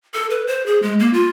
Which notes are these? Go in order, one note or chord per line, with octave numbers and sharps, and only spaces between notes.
A4
B4
C5
G#4
G#3
A#3
F4